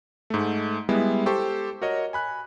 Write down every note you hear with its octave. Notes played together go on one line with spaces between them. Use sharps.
G#2 A3
G3 G#3 B3 E4
G4 A4 C5 C#6
F#4 A#4 C#5 D#5
G#5 B5 F#6